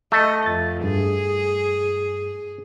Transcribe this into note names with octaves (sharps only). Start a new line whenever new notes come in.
A3 D#5 A5 E6
F2 A6
G2 G#4